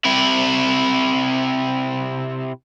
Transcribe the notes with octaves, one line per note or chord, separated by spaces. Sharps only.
C3 E4